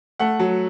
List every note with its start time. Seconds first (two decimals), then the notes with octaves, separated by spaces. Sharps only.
0.19 A3 F#5
0.39 F#3